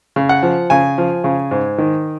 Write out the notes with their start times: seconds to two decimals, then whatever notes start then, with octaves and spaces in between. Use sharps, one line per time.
0.16 C#3
0.29 F#5
0.43 F3
0.70 C#3 G#5
0.98 F3
1.24 C#3
1.51 G#2
1.78 D#3